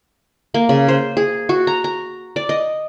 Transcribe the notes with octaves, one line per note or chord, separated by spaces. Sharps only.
A#3
C#3
C5
G#4
F#4
A#5
A#5
D5
D#5